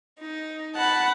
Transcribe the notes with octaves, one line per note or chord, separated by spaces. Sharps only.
D#4
F#5 A5 B5